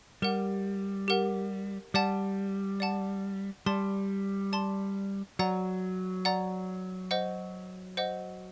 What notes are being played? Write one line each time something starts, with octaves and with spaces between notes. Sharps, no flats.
G3 G4 A#4 F#5
G4 A#4 F#5
G3 D5 F#5 A5
D5 F#5 A5
G3 D5 A5 C6
D5 A5 C6
F#3 D5 F#5 A#5
D5 F#5 A#5
C5 D#5 F#5
C5 D#5 F#5